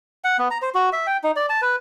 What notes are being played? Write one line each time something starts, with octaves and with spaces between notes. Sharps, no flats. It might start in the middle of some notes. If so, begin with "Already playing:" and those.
F#5
B3
A#5
C5
F#4
E5
G5
D#4
D5
A5
B4